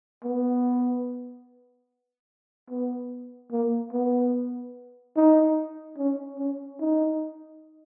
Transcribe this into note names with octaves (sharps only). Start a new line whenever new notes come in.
B3
B3
A#3
B3
D#4
C#4
C#4
D#4